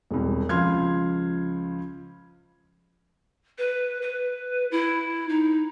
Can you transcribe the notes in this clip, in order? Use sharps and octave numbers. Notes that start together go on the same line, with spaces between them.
E1 C2
C#2 F3 C6 F6 G#6
B4
B4
E4
D#4